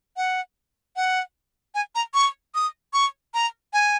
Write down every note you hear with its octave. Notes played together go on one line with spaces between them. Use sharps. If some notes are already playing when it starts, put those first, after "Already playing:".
F#5
F#5
G#5
A#5
C#6
D#6
C#6
A#5
G#5